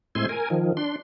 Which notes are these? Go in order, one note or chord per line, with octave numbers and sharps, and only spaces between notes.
A2 G#3 C4 E4 G#5 C6
A#4 G#5
D#3 F3
D4 C6